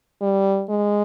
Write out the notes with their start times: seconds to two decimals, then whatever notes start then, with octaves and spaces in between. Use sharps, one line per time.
0.21 G3
0.69 G#3